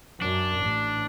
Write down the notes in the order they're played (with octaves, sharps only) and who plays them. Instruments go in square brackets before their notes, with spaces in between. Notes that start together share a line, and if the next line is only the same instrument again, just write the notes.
[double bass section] F#2 [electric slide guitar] D4
[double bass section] A1